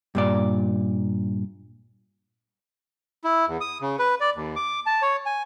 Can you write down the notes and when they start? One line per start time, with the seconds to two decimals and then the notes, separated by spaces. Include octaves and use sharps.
0.15 G2 A#2 D5
3.24 E4
3.48 E2
3.61 D#6
3.82 C#3
3.99 B4
4.20 D5
4.36 D#2
4.56 D6
4.86 A5
5.02 C#5
5.26 G#5